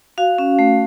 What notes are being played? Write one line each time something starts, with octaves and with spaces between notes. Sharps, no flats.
F#4 F5
C#4
A3